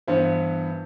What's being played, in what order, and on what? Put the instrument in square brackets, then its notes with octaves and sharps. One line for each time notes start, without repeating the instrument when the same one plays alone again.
[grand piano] G2 E3 B3 E4 [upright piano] C5